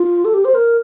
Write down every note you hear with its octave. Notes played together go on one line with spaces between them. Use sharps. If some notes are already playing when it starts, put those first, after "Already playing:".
Already playing: F4
A4
G4
C5
A#4